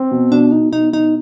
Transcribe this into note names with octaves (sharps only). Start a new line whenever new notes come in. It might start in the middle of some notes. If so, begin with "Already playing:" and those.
Already playing: C4
B2
B2 D4
B2 D#4
B2 D#4
B2 D#4